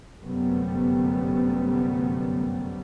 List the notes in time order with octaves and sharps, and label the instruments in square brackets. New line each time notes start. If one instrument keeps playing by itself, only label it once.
[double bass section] G1 F#2 C3 G3 A3 B3